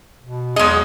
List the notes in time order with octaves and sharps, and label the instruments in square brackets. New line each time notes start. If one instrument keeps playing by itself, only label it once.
[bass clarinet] B2
[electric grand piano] B1 G#4 [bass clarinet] E2 [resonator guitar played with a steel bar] G#3 D#5